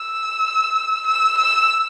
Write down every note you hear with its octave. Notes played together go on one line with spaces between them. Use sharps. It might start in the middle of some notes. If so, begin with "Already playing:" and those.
Already playing: E6
E6
E6